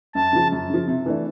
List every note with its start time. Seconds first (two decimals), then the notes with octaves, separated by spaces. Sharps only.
0.14 F#2 A5
0.33 C#3 F3
0.52 F#2
0.70 C#3 F3
0.88 C3
1.06 E3 A3 D4